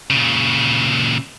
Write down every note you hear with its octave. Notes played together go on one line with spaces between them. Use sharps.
A#2 C#3